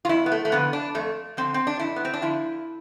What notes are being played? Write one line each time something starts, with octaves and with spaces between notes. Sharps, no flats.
F4
F2 E4
B3
A3
A3
D3 F3 B3
D4
F2 A3
D3 F3 C4
C4
D4
F2 E4
B3
C4
D4
D3 F3 E4